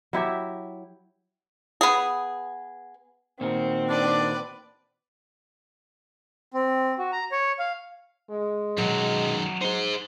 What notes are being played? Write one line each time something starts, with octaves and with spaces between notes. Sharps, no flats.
F#3 E4 G4 E5
B3 G#4
A#2 D#3 C4 F#4
D4 B4 D5
C4
F#4
A#5
C#5
F5
G#3
F#2 B2 D#3 F#3
D#4 G#4 C5 C6